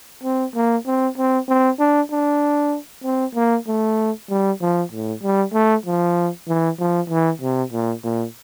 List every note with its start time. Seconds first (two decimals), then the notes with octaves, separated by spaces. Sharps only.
0.24 C4
0.55 A#3
0.86 C4
1.18 C4
1.48 C4
1.79 D4
2.11 D4
3.04 C4
3.35 A#3
3.67 A3
4.30 G3
4.61 F3
4.92 A2
5.23 G3
5.53 A3
5.86 F3
6.48 E3
6.79 F3
7.10 E3
7.42 C3
7.73 A#2
8.04 A#2